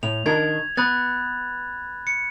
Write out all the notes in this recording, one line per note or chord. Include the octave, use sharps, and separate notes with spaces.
A2 F7
D#3 D4 A#4 G#6
B3 B5 F#6 A6
C#7